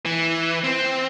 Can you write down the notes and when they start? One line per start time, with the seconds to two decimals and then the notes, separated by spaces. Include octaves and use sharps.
0.06 E3
0.64 C4